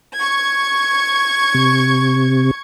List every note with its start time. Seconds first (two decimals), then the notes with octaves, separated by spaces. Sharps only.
0.18 C#6 G#6
1.54 C3